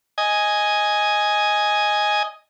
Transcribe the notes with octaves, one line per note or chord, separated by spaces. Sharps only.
D#5 G#5